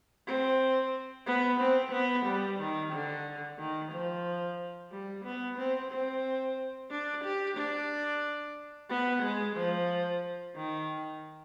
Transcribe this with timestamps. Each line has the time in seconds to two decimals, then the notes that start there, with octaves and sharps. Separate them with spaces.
0.27 C4
1.27 B3
1.60 C4
1.92 B3
2.26 G3
2.59 D#3
2.92 D3
3.58 D#3
3.91 F3
4.91 G3
5.24 B3
5.58 C4
5.91 C4
6.90 D4
7.24 G4
7.57 D4
8.89 B3
9.22 G#3
9.56 F3
10.56 D#3